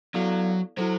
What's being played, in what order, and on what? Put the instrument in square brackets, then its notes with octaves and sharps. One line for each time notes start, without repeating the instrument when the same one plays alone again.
[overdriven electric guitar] F#3 [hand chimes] B3 E4 A4 D5 F5
[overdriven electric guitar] F#3 [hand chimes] E4 A4 C5